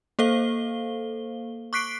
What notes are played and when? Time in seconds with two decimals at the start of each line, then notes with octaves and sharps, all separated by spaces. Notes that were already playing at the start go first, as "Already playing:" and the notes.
0.19 A#3 A4 C5 F5 G7
1.73 C#6 D6 F#6 B6 C7 D7